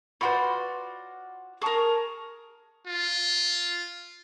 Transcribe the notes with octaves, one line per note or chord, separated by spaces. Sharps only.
F4 F#4 B4 C#5 D5 F#5 B5 C6
G#4 A#4 A5 C#6 D#6
F4